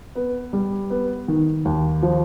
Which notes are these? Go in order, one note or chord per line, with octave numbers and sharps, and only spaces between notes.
B3
G3
B3
D#3
D#2
F3